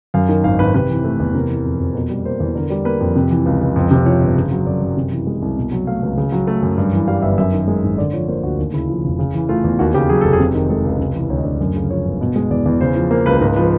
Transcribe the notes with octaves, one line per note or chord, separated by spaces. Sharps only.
F#2 F5
D#3
G#1 F5
G#1 B4
C3 B4
E3
A3
E2
C3 A#4
E3
F2
F2
B2 A#4
G3
A#3 C5
E2
D3 A#4
G3
A#3 B4
F2
C3
E3
C#2
C#2
F2
C3
F3 C#5
G1
C#3
F#3
F#2 D5
F#2
C3
E3
G#3
C2
B2
F#3
A3 F5
C#2
C#3
F#3
A3
F#2
G2
E3
G3 F5
G1 E5
F#2 E5
D#3
G#3
G#1
D3 D5
F3 C#5
A#3 C5
D2 F#4
D#2
C#3 E4
F3
F1
C#3
E3
A3 F4
E2
D#2 F#4
C#3 G4
F#3 G#4
F1 A4
G#4
C3
D#3
G#3 A4
C#2
C3
E3
D2 C#5
D#5
D2 D5
F#2
C#3
F3 C#5
G1
B2
G#3
E2 D5
E2
C#3 C5
F3
A#3 C5
C#2 B4
G#2 A#4
F3 B4